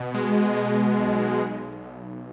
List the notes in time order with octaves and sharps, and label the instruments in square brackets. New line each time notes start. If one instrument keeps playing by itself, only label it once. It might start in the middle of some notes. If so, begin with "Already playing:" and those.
Already playing: [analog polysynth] B2
G#3
G#3
B1
B1
B1